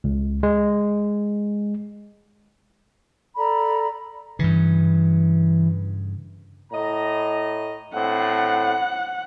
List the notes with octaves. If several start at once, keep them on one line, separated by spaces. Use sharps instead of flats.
C#2
G#3
A4 D5 A#5 B5
G2 C#3 E3
A2 D#5 A#5
A2 C4 D4 F#5